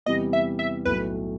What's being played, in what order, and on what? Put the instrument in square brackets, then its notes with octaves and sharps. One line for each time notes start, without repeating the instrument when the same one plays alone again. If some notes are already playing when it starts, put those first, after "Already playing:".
[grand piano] E2 C3 E3 G3 B3 [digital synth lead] D#5
[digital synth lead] E5
E5
[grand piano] B1 A2 F#3 A3 [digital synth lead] B4